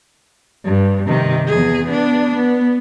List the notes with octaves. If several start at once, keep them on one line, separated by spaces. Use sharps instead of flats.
G2
C3 D#3
E2 G#4
B3 D4
B3